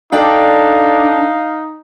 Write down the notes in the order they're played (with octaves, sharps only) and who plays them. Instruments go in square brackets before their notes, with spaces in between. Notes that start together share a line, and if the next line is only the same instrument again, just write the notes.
[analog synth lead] D4 [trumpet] D#4 [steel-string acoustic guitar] A4 D5 G5 [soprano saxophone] F5